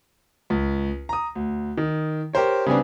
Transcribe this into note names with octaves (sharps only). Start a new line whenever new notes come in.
C#2
A#5 D#6
D2
D#3
G4 A#4 C5 C#5
C#3 G3 B3 C4 D4